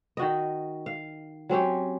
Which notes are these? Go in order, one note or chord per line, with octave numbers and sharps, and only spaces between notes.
D#3 F#4 D#5
F5
F#3 C4 C#4 G4